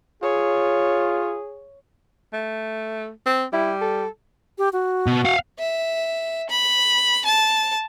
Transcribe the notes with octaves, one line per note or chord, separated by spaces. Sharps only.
F4 G#4 C#5
A3
C4
G3 E4
A4
G4
F#4
B2
F5 F#5
E5
B5
A5